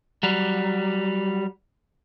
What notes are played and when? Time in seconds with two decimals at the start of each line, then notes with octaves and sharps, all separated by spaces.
0.23 F#3 G3